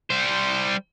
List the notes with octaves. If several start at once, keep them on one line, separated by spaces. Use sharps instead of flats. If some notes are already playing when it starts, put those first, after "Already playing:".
G3 C5